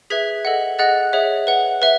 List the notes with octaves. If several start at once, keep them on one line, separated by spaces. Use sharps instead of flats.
G#4 B4 E5 G#6 B6
A4 D#5 F#5
G#4 D#5 F#5 F#6 A6
G#4 C#5 E5
B4 F#5
B4 E5